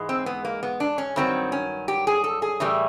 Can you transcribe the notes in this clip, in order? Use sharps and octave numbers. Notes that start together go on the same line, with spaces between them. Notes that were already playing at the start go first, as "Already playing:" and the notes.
Already playing: G#2 E3 G#3
C4
B3
A#3
B3
D4
C#4
G2 D#3 F#3 C4
C#4
G4
G#4
A4
G#4
A2 E3 G3